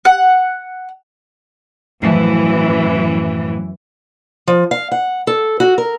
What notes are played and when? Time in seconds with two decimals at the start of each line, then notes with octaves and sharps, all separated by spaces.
0.05 F#5
2.02 F#2 A2 E3 F3 A5
4.47 F3
4.71 F5
4.92 F#5
5.27 A4
5.60 F#4
5.78 A#4